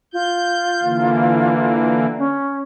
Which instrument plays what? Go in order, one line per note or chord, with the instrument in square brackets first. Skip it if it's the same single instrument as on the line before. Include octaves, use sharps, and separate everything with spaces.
[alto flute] F4 [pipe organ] G6
[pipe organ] D3 E3 A#3
[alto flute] C#4